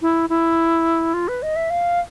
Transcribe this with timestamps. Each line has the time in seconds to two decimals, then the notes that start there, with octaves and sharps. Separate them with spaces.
0.02 E4
0.29 E4
1.14 F4
1.28 B4
1.43 D#5
1.56 E5
1.70 F5